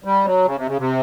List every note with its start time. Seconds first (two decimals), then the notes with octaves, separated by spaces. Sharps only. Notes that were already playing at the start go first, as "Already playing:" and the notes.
0.04 G3
0.25 F#3
0.45 C#3
0.56 C3
0.67 C#3
0.78 C3